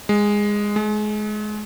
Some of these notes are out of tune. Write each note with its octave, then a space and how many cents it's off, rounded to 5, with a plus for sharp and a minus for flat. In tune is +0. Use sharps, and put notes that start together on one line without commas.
G#3 -10
G#3 +30